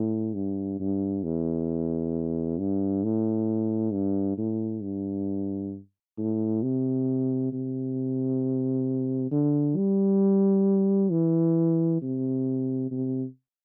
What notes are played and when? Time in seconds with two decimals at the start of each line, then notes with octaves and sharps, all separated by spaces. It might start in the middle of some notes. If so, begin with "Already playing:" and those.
Already playing: A2
0.34 G2
0.79 G2
1.23 E2
2.58 G2
3.04 A2
3.92 G2
4.38 A2
4.82 G2
6.17 A2
6.63 C3
7.52 C3
9.31 D3
9.77 G3
11.11 E3
12.01 C3
12.91 C3